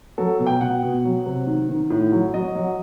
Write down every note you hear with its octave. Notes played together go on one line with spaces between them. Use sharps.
F#3 A4
B2
G5
B2 F#5
B2
F#3
C3
D#3
D#3
A2
F#3
F#3 D#5
F#3